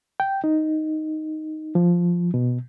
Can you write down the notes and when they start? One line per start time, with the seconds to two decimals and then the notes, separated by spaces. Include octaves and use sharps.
0.20 G5
0.44 D#4
1.75 F3
2.34 B2